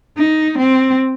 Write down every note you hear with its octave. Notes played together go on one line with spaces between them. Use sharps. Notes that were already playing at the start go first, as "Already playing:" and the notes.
D#4
C4